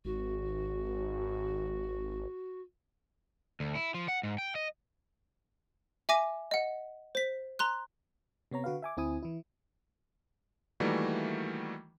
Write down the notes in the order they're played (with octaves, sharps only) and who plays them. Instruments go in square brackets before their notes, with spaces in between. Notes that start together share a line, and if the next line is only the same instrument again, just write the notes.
[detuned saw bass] G#1 [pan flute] F#4
[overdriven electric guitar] D2
E4
F3
F#5
G#2
G5
D#5
[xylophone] E5 G#5 D6 A#6 D#7
D#5 F#5
C5 B6
A#5 C6 F#6
[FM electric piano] C3 B3 C#5 A#5
D3 F#4 B4 F5
E5 G#5 D6
D2 C4 E4 G#5 D#6
E3 E4
[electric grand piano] D#3 E3 G3 A3 A#3 F#4